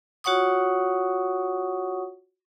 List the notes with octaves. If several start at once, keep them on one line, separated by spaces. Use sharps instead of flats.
F4 F#4 C#5 F#5 C#6 D#6